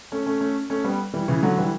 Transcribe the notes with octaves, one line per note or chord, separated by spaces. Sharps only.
A3 C#4
A3 C#4
A3 C#4
A3 C#4
G3 B3
E3 G3
C#3 E3
D3 F#3
E3 G3